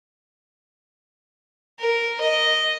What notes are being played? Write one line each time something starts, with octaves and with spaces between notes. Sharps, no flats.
A#4
D#5